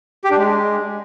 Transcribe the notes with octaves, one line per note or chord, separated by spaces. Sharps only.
G4
D4
G#3